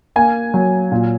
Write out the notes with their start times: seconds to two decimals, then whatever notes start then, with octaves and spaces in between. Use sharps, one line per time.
0.16 A#3 G#5
0.54 F#3
0.92 A#2